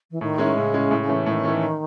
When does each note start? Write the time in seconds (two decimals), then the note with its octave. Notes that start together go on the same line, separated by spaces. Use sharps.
0.11 E3
0.21 A2 D#3
0.38 G#3 C#4 E4
0.56 A2 C#3
0.74 G#3 C#4 E4
0.91 A2
1.09 E3 A3 C#4
1.26 A2 D#3
1.44 E3 A3 C#4